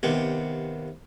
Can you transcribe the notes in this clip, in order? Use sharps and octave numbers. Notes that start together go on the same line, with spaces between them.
D#2 C3 B3